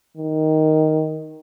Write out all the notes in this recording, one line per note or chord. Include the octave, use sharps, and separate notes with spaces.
D#3